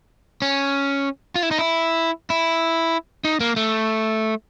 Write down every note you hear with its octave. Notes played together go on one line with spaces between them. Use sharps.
C#4
F4
E4
D#4
E4
E4
D#4
A#3
A3